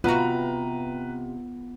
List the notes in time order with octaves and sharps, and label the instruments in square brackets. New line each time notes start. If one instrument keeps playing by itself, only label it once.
[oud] C3 F#4 [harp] B3 [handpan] F4 [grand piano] B4 A#5